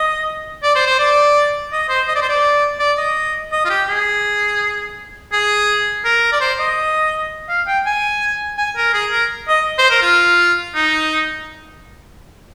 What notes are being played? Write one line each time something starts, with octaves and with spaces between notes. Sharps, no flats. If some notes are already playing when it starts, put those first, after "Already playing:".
Already playing: D#5
D5
C5
C5
D5
D#5
C5
D#5
D5
C5
D5
D5
D#5
D#5
F4
G4
G#4
G#4
A#4
D5
C5
D#5
F5
G5
G#5
G#5
A#4
G#4
A#4
D#5
C5
A#4
F4
D#4